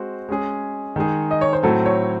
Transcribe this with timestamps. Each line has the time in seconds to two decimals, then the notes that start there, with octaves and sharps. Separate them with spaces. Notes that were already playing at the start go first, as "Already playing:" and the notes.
Already playing: G#3 C4 F#4 C5
0.29 G#3 C#4 G#4
0.96 D#3 G#3 D#4 G#4
1.31 D#5
1.41 C#5
1.53 C5
1.63 A2 F#3 C4 A4
1.86 C#5